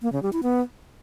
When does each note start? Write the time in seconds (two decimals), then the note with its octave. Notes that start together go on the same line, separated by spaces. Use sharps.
0.02 A#3
0.12 C#3
0.23 G3
0.33 E4
0.43 B3